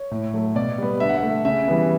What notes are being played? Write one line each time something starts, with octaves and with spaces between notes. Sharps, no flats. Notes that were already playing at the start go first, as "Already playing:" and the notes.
Already playing: C#5
A2
F#3 A3
B2 D5
G3 B3
D3 E5
F#5
E5
A3
C#3 E5
E3 G3 B3